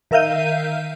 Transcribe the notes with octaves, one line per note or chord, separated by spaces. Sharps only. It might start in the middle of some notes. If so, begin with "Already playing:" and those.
D#3 A#4 E5 F5 G6 D#7